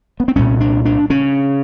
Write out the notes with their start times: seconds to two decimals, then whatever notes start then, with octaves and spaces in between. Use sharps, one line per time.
0.20 B3
0.28 C4
0.36 C2 A#2 C#4
0.60 D4
0.85 D4
1.10 C#3 C#4